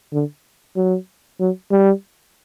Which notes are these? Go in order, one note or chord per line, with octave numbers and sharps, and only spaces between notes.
D3
F#3
F#3
G3